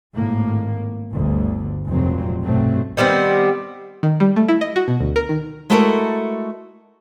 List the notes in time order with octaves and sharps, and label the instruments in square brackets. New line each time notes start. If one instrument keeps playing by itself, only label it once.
[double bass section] G#1 A2 A#3
G1 D2 D3
F1 C#2 A#2 F#3 C4
B1 G2 B2 F#3 A3 C4
[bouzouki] D#3 G3 B3 C4
[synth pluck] D#3
G3
A3
E4
D#5
F#4
B2
D2
A#4
D#3
[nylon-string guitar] G#3 A3 E4 F#4 A4 A#4